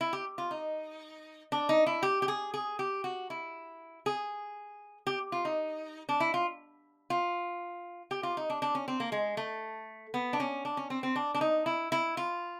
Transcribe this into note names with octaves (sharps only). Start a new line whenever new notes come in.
E4
G4
F4
D#4
D4
D#4
E4
G4
G4
G#4
G#4
G4
F#4
E4
G#4
G4
F4
D#4
D4
E4
F4
F4
G4
F4
D#4
D4
D4
C#4
C4
A#3
G#3
A3
B3
D4
C#4
D4
C#4
C4
C4
D4
D4
D#4
E4
E4
F4